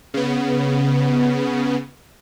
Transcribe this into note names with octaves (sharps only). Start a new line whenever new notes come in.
C#3 B3